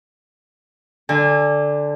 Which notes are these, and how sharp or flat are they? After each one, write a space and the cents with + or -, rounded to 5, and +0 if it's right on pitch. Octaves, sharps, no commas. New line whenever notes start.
D3 +0 G#5 -35